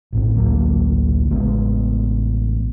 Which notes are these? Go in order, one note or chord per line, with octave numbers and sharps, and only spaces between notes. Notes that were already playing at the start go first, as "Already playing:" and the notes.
A1 A2 C4
A1 D2 F#3 A#3
A1 C#3 G#3 B3